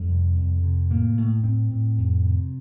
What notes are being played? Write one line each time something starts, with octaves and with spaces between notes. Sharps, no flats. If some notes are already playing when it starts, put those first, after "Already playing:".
Already playing: F2 G3
C3
F2
C3
A2 A#3
A2
A2 C4
A2
F2
C3